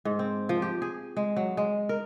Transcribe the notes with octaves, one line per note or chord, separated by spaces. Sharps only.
G#2
C4
F3
G4
G#4
G#3
F#3
G#3
A#4